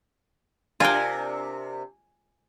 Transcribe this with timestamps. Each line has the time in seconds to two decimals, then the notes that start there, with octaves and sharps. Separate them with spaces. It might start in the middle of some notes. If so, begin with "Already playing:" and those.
0.80 C3 D4 F4 A#4 G5 G#5